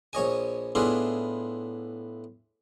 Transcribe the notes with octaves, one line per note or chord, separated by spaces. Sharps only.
A#1 C#5 D#5 G#5
A2 B3 D4 E4 F4 G#4